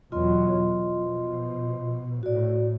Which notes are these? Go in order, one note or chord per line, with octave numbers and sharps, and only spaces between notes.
E2 B2 F#3 F4 D#5 C6
B2 F3
A2 F#4 D5